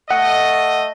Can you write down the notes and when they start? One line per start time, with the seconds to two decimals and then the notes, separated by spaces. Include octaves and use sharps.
0.11 A3 D#5 F#5